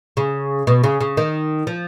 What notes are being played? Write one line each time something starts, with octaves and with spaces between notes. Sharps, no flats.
C#3
B2
C#3
C#3
D#3
F3